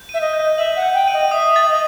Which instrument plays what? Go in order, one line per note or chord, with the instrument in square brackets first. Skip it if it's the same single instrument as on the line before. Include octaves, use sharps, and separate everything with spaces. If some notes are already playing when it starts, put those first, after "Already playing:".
Already playing: [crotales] G6
[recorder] E5 [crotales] D#7
[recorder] D#5
[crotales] G6
[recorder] E5 [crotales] F#7
[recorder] F#5
[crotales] G6
[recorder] G5
[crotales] D#7
[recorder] D#5
[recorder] E5 [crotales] D#6
[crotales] A6
[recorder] E5
D#5